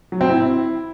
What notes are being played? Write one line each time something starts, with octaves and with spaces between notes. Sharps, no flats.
F#3
C4
E4